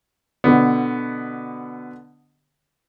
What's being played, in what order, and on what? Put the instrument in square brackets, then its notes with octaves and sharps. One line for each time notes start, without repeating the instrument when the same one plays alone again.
[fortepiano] B2 D3 B3